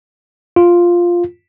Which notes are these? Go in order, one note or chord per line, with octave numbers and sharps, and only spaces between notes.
F4